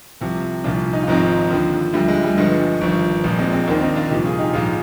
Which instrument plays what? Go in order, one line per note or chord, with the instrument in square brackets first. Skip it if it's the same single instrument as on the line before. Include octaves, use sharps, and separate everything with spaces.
[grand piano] C2 C3 F3
C2 A#2 F3 D4 F4
D#4
F4
G#1 G#2 F3 C4 D#4
D#2 D3 F3
D2 D3 F3 G3
G#3
G3
G1 G2 D3 F3 G#3
G#1 G2 F3
A#1 A#2 F3
G#3 C4
G#3 C4
D#2 A#3 D4
D#3
D4
C4 D#4
D4 F4
C2 A#2 F3 D#4 G4
F4 G#4
D#4 G4
A#1 G#2 F3 F4 G#4